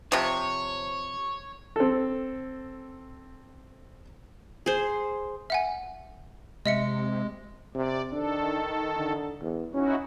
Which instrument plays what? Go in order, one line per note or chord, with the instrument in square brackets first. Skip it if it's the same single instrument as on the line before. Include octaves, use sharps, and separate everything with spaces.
[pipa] C3 F3 [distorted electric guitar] C#5
[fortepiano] C4 A4
[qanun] G#4 C5
[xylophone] E5 F#5 G#5
[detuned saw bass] C3 [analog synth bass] G#3 [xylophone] D#5 E5 C#7
[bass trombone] C3 [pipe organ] D5
[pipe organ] D#3 A4 [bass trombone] D4
[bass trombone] D3
E2
[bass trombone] C#4 [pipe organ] D#4 E4 F#4